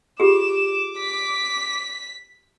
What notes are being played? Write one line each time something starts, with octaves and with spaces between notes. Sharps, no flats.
F4 G4 G#4 D6 E7
B6